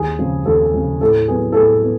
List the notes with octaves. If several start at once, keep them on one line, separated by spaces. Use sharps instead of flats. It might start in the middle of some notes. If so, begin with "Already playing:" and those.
Already playing: D#2 G#4
C#3 F3
D#2 A4
C#3 F3
A2 A4
F#3 B3 G#4
A4
A2 G#4
B3